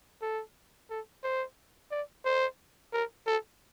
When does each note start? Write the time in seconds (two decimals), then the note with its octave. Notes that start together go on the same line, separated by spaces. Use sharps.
0.22 A4
0.90 A4
1.24 C5
1.92 D5
2.26 C5
2.93 A#4
3.27 A4